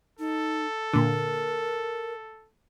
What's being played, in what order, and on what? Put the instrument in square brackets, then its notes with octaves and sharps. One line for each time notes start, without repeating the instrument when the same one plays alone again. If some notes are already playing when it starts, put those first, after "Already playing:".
[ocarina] D#4 [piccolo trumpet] A4
[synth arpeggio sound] A#2 D3 [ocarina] A#4